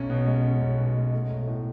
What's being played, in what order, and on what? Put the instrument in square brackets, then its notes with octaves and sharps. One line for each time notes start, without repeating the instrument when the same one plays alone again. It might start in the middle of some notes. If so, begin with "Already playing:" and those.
Already playing: [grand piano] B1 C#4
B2
G#3
C#4
B1
B2
G#3
A3
B1
A2